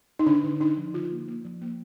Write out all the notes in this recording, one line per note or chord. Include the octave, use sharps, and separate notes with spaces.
D#4
D3 D4
D3
D4 D#4
F3
D3 F4
A#3
A#3
F3
A#3